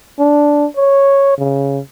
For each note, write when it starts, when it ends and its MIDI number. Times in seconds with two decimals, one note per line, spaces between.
0.19 0.66 62
0.77 1.36 73
1.38 1.79 49